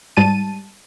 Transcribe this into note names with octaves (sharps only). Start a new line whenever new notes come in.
G#2 G3 A5 D#7